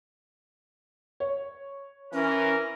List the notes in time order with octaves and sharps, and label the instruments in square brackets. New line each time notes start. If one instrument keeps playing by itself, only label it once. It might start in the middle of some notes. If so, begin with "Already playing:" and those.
[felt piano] C#5
[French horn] E3 [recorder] C#4 [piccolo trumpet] A#4